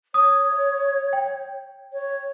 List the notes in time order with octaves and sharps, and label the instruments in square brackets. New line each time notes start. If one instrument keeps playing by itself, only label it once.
[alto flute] C#5 [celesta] D#6
[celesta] G5
[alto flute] C#5